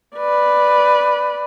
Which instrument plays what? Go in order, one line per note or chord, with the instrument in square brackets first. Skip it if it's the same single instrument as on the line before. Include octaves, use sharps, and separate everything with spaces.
[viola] B4 D5